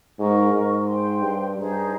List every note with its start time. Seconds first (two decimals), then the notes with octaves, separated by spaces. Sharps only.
0.18 G#2 A#4 D#5 A#5 C#6
0.54 G#2
0.87 C5 G5 C6
1.22 G2
1.57 G2 D#4 G#4 C5